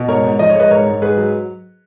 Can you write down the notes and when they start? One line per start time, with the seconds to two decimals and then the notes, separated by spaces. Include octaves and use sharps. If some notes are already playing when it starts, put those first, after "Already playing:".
Already playing: B2
0.08 G#2 A#4 C#5
0.24 G#2
0.39 F3 D#5
0.49 C#5
0.55 G#3 B4 D#5
0.71 G#2 A#4 C#5
0.86 G#2
1.02 G#2 G#4 B4
1.17 F#3